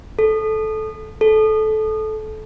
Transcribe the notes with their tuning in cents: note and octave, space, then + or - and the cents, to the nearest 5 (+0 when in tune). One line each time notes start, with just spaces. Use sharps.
A4 -15
A4 -20